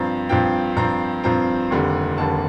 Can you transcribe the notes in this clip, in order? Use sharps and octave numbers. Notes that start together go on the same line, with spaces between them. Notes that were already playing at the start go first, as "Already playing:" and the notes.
Already playing: G2 F3 C4 A#5
G2 F3 C4 G5
G2 F3 C4 A#5
G2 F3 C4 A#5
F1 D#2 D3 G3
F1 D#2 D3 G3 A5